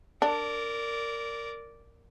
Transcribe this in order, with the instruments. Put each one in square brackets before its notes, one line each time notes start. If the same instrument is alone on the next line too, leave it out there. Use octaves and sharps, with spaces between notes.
[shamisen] D4 [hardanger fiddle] A#4 D5